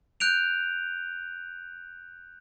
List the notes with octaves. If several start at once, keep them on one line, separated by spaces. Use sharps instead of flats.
F#6 G6 D7 F7